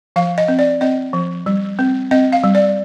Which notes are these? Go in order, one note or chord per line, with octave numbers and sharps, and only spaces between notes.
F3 F5
D#5
C4
D5
C4 D#5
F3
G3
C4
C4 D#5
F5
G3
D5